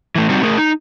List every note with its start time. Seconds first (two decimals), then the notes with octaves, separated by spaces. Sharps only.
0.15 E3 A3
0.30 G3 C4 D#4 F#4
0.43 A3 G#4 A#4
0.58 D#4